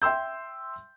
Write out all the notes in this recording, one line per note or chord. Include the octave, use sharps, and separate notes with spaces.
E5 G5 C6 E6 G6